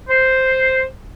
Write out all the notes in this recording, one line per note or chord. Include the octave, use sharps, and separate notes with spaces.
C5